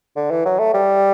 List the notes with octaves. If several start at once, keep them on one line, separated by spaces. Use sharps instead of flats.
D3
E3
F#3
A3
G3